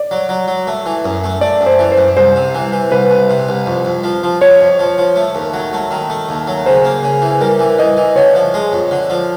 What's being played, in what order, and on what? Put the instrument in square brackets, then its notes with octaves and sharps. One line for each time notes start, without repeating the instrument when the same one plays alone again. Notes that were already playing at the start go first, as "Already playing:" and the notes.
Already playing: [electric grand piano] D5
[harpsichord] F#3
F#3
F#3
A3
E3
F#2
A3
[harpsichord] A3 [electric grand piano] D5
[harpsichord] F#2
[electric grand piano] C5
[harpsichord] E3
[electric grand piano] C5
[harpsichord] F#2
[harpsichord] C2 [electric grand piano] C5
[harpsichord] C3
E3
E3
[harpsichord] C2 [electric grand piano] B4
[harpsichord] C2
C3
C2
F2
F2
F3
F3
[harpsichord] F3 [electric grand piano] C#5
[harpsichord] F2
F3
F3
A3
D#2
F#3
A3
D#3
A3
D#2
F#3
[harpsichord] C#3 [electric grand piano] C5
[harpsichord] A#3
C#3
E3
[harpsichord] G3 [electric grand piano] A#4
[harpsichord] E3
[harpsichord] E3 [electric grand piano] D#5
[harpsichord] E3
[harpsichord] D3 [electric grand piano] C#5
[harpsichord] F3
G#3
F2
D3
F3